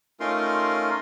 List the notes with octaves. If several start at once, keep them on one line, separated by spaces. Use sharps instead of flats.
A3 C#4 D#4 F4 A#4 C6